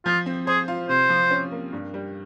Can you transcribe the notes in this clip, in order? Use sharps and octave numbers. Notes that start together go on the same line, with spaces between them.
F3 F4
C4
G#4 C5
F4
C3 C5
F3
C#4
A#3
G2
G3